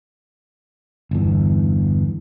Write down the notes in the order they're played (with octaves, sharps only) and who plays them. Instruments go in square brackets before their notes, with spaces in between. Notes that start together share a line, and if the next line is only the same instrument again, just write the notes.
[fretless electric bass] G1 E2